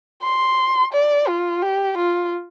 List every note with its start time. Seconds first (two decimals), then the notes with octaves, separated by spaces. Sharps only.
0.23 C6
0.93 D5
1.28 F4
1.62 G4
1.97 F4